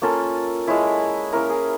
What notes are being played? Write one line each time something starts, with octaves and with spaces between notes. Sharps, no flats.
A#3 C#4 F4 A4
G#3 C#4 E4
A#3 C#4 E4 A#4
G#4